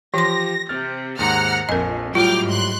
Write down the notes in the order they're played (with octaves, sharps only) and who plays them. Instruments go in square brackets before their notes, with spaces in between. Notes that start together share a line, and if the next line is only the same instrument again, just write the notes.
[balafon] E3 C6 [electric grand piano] F3 G4 [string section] A#6
[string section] C3 [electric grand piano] F6 A6
[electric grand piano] D#2 G#2 [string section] F#5 A#5 F6
[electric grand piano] A#1 G#5 [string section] F2 [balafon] A#4 D#5
[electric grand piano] A2 F#3 G3 [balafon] F4 [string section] G5 D6 F6
[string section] G#2 C6 F#6